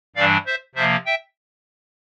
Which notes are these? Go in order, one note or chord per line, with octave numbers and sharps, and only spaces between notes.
G2 E3 G3 D4 D5 F5
C5 E5
C3 F3 A#3 C5 E5
E5 G5